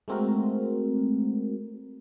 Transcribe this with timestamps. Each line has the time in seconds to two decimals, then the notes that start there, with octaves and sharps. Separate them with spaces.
0.08 G#3 A3 C4 F#4 A#4